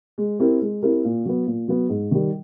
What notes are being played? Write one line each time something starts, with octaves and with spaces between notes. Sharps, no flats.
G#3
C4 E4 G4 A#4
G#3
C4 E4 G4 A#4
A#2
F#3 B3
A#2
F#3 B3
G#2
D#3 G3